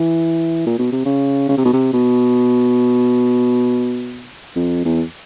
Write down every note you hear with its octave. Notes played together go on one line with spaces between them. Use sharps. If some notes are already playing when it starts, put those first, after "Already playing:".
Already playing: E3
A#2
B2
C3
C#3
C#3
C3
B2
C3
B2
F2
E2